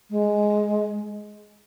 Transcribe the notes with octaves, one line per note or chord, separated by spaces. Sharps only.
G#3